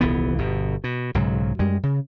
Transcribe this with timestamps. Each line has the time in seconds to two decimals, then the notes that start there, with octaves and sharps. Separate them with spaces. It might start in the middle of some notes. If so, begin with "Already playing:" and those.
0.01 D#1 C2 E3 B3
0.38 G1 B2
0.84 B2
1.15 B1 G#2 C#3 F#3
1.59 F#2 G3 G#3
1.83 C#3